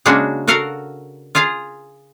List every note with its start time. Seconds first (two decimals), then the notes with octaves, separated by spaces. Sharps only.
0.06 C#3 G#3 A#3 C#4 D4 F#4
0.47 F#4 A4 A#4 F5 F#5
1.35 F4 G#4 F5 A#5